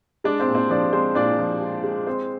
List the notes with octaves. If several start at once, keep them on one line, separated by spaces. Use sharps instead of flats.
G#3 D4 D5
C4 C5
A#2
C4 C5
F3 D4 D5
G#3 C4 C5
A#2 D4 D5
F3
G#3
G#3
G#3 C4 C5